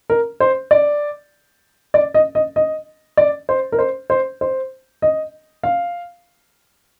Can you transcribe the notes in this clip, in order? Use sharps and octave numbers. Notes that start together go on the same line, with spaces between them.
A#4
C5
D5
D5
D#5
D#5
D#5
D5
C5
A#4
C5
C5
C5
D#5
F5